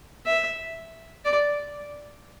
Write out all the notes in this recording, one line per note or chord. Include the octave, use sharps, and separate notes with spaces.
E5
D5